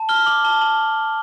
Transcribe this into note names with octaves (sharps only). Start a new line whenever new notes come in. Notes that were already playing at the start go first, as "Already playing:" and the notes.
Already playing: A5
F6 G7
D6 F#7
A5 G7
A5 F#7